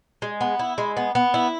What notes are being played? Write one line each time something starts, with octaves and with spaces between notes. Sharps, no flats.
G#3
B3
E4
G#3
B3
B3
E4